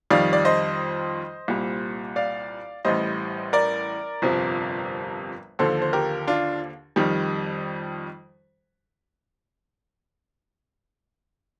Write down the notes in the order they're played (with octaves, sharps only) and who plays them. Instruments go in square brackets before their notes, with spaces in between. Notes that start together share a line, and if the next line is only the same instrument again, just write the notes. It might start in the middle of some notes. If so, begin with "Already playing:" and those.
[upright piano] F2 D#3 G3 D5 F5
D5
C5 D#5
C2 A#2 G3
D5 F5
A1 A2 G3 C5 D#5
A#4 D5
G1 F2 C3 F3
D#2 D3 F3 A4 C5
C5
G4 A#4
D4 F4
F2 D#3 G3